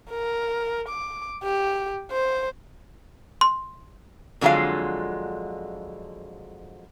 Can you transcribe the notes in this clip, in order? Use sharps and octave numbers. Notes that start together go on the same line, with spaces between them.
A#4
D6
G4
C5
C6
F2 D3 F#3 G#3 F4 F5